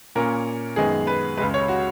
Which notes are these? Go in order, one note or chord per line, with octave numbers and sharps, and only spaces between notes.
A#2 A#3 C#4 A#4
F#2 D#3 G#3 B3 G#4
B4
C#2 C#3 G#3 B4
C#5
F#4